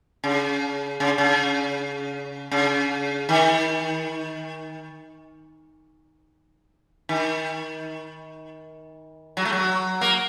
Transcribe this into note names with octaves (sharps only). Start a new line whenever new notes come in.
C#3
C#3
C#3
C#3
D#3
D#3
F#3
A3
F#3
A#3